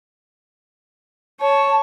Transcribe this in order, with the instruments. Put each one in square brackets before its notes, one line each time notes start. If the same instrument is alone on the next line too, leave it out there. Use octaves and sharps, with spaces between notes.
[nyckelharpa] C#5 [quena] A5